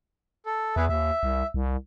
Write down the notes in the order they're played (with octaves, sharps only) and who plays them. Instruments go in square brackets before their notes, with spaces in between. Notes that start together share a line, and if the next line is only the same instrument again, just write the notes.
[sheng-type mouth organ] A4
[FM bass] E2 [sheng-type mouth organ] G#4 B4 E5
[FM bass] D#2 [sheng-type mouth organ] E5
[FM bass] C2
C2